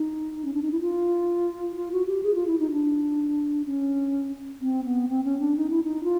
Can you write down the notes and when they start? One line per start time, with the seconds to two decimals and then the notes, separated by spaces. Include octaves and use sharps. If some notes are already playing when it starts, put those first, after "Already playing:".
Already playing: D#4
0.44 C#4
0.54 D4
0.62 D#4
0.71 E4
0.81 F4
1.76 F4
1.92 F#4
2.07 G4
2.23 G#4
2.35 F4
2.47 E4
2.59 D#4
2.71 D4
3.66 C#4
4.61 C4
4.84 B3
5.09 C4
5.24 C#4
5.39 D4
5.57 D#4
5.70 E4
5.83 D#4
6.04 F4